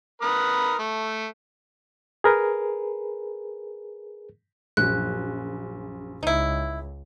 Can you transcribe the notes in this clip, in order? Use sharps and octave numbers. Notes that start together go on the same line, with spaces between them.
A#4 B4 D#6
A3
G#4 A#4 B4
A#1 F#2 F#6
C#2 D#4 E4